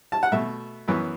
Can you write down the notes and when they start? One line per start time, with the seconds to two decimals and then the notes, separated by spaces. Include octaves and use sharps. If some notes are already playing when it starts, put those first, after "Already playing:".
0.12 A5
0.23 F#5
0.32 B2 A3 E5
0.88 F#2 E3 B3